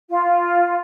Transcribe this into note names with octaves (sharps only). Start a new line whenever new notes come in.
F4